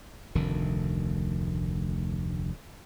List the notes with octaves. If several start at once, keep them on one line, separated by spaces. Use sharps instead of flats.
F1 D2 D#3